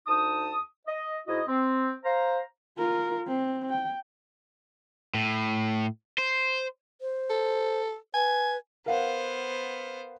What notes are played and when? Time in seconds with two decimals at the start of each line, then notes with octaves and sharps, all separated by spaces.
0.07 D2 D#4 A5 D#6
0.87 D#5
1.27 G#2 E4 F#4 D#5
1.48 C4
2.04 C5 F5 A#5
2.78 F4 A#4
3.27 C4
3.70 G5
5.14 A2
6.18 C5
7.01 C5
7.30 A4
8.14 B4 G#5
8.86 B3 A#4 C5 F5 F#5